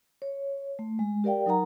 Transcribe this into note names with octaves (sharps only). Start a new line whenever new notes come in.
C#5
A3
G#3
G4 A#4 D5 F5 G5
F#3 D#4 A#4 F#5 A#5